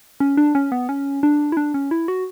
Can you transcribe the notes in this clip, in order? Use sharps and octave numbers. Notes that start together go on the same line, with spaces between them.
C#4
D4
C#4
B3
C#4
D4
E4
D4
C#4
E4
F#4